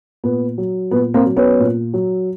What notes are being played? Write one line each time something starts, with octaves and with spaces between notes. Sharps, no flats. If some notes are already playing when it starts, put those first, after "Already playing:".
A#2 B3
F#3
A#2 B3
A#3 C4
F#3
B3 C#4
A#2
F#3